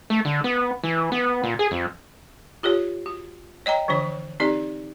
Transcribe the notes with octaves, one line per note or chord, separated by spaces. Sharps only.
A3
D3
B3
E3
B3
A#2
G#4
F2
F4 G4 A4 C#5
F#4
C#5 D#5 G5 A#5
D3 E3 F3 D4 C#5
C4 D#4 G4 A4 D5